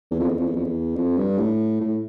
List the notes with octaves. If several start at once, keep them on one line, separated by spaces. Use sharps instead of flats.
E2
F2
E2
F2
E2
F2
E2
F2
G2
A2
A2